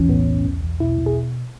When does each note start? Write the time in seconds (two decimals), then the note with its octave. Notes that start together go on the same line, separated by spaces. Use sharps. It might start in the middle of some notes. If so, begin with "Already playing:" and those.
Already playing: B1 E2 E3 C#4
0.09 A2 B3
0.27 B1
0.45 E2
0.63 E2
0.80 B2 E4
0.98 B2
1.06 G#4